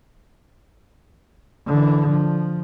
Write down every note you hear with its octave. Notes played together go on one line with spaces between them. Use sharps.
D3 E3
F3